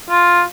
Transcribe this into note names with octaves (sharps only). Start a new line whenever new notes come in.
F4